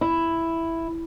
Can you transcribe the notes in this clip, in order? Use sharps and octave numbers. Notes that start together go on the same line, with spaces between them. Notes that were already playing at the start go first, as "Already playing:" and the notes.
E4